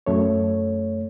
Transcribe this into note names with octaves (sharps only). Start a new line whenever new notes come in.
F#2 A3 C#5